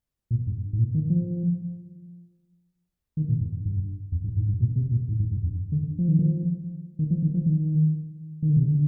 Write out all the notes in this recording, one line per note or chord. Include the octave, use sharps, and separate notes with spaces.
A#2
G2
G#2
A#2
D#3
F3
D#3
A#2
G2
G2
F2
G2
G#2
G2
A#2
C3
A#2
G#2
G#2
G2
F2
D3
F3
D#3
F3
D#3
F3
D#3
F3
D#3
D#3
D3
C3
D3